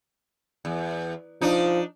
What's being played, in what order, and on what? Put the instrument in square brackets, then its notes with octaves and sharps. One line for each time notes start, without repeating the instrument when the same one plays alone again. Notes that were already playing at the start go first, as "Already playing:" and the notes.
[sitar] E2
[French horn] F3 [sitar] D4 D#4